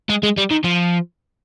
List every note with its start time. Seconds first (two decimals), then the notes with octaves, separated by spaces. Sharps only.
0.10 G#3
0.23 G#3
0.37 G3
0.51 D#3
0.64 F3